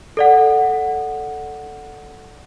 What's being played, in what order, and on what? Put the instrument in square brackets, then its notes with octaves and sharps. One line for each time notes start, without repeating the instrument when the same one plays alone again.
[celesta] A4 D5 F#5